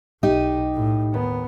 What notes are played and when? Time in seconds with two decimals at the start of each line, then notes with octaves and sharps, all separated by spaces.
0.23 B1 D#4 G4 D#5
0.75 A2
1.14 D#2 B3